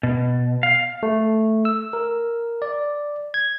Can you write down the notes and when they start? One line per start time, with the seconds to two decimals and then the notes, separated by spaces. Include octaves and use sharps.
0.03 B2
0.63 F5
1.03 A3
1.65 E6
1.93 A#4
2.62 D5
3.34 G#6